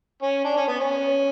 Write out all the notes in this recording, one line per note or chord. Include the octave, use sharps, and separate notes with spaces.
C#4
D4
C#4
B3
C#4